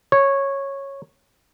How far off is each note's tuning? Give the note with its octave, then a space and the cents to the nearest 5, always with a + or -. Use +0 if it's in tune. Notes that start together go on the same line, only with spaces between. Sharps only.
C#5 -10